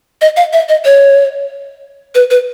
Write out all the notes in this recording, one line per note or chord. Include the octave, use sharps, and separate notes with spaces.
D#5
F5
E5
D#5
C#5
B4
B4